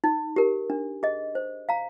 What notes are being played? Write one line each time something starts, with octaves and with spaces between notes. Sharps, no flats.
D#4
G4 A#4
D4
G#4 D#5
C5
F5 A#5